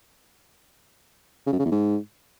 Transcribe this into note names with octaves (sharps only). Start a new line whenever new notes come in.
C#3
F#2
C#3
E2
G#2